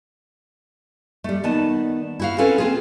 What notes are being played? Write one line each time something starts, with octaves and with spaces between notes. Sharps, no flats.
G3 A3
D#3 B3 D5 A5
E4 F#4 F5
C4 C#4 F4 A4 B4
C4 F4 G#4